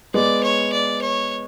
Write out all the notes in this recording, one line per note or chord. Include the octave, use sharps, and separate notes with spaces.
G#3 B3 D5
C#5
D5
C#5